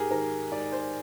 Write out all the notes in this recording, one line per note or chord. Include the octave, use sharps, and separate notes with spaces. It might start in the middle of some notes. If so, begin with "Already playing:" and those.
Already playing: G#2 G4 G#4 A#4
D#3 A#4
G#2 D5
C5